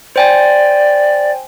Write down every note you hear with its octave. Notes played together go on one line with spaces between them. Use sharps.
C5 D5 G5 G#5